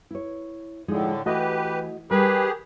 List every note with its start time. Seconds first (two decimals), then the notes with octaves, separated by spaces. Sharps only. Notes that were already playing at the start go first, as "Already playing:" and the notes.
0.11 E4 C#5
0.88 A2 D3 F3 G#3 D#4
1.26 E3 A3 F#4 G4 B4 D#5
2.11 G3 G4 G#4 A#4 B4